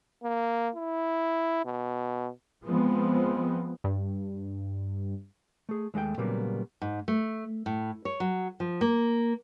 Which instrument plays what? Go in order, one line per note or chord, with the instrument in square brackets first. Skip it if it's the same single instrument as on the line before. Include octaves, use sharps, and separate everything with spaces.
[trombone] A#3
E4
B2
[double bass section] F3 G#3 B3 C4
[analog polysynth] G2
[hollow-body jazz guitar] A3 G#4
D#2 G#3 A3 F#5 G5
A#2 C#3 F#3 G3 A#3 B3
[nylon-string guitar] G#2
A3
A2
C#5
F#3
F3
A#3